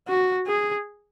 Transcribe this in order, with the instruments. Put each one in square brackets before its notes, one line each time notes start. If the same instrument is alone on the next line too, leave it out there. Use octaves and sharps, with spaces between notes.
[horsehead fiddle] F#4
G#4